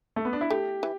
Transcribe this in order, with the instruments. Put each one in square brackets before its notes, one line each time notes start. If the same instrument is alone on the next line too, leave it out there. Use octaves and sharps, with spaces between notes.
[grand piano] A3
B3
D4
E4
[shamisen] A3 [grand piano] G4
[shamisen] E3